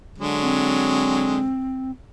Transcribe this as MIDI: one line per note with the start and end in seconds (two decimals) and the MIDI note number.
0.18 1.46 50
0.18 1.46 54
0.18 1.46 56
0.42 1.91 60